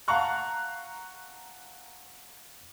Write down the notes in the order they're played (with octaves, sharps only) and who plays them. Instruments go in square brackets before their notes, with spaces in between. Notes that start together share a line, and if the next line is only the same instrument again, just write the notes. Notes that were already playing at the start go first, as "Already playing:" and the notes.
[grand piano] F5 F#5 A5 A#5 C#6 F#6